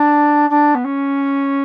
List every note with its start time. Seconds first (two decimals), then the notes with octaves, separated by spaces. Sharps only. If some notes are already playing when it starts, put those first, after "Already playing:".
Already playing: D4
0.50 D4
0.74 B3
0.84 C#4